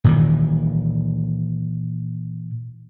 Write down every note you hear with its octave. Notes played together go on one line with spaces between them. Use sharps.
A#2 D#3 E3